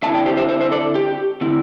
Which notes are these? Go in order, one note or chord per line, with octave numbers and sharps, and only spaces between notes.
D3 C4 E4 E5 A5
D5 G5
G4 C5
C5 E5
C5 E5
C5 E5
A4 D5
G4
D3 C4 E4